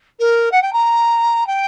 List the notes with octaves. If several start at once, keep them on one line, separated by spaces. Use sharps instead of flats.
A#4
F#5
G5
A#5
G5